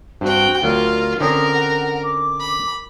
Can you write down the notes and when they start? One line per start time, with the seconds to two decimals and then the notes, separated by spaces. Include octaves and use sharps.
0.21 G2 C4 F#4 G5
0.62 D2 F#3 F4 A#4 F#5
1.20 D3 C4 C#4 A#4 D#6
1.53 F#5
2.02 D6
2.40 B5